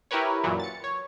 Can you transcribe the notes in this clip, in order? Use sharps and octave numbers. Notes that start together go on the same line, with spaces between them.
E4 G4 A#4 B4 C#5
F#2 A#2 E3 F#3
A6 C#7
C#5